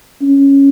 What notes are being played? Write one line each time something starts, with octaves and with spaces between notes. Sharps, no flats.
C#4